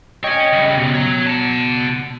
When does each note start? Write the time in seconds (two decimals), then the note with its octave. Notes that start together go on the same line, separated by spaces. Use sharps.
0.24 C#5 D#5 G5 G#5 C#6
0.53 C#3 G3
0.77 B2
0.94 C#5 A#5
1.27 F#5 A5